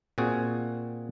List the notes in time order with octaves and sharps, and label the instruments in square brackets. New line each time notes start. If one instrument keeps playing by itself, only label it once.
[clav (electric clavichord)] A#2 C4 F#4 G#4